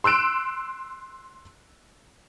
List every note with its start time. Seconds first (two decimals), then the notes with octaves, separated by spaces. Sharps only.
0.04 C6 E6 F#6 D7 E7